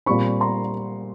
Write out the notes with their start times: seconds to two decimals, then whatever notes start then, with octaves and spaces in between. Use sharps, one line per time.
0.06 A#2 G3 C4 B5 C#6
0.41 A#5 C6